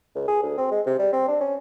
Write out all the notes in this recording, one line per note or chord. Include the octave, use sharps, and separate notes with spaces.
C#2
G#4
D2
C4
G#3
C3
G3
C4
D4
C#4